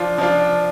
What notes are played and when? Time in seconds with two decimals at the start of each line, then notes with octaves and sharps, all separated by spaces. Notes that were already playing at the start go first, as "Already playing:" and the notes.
Already playing: F3 D4 F4
0.18 F3 D4 F4